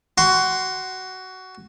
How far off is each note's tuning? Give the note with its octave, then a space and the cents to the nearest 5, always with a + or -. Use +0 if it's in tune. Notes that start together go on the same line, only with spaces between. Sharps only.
F#4 +15 C6 +0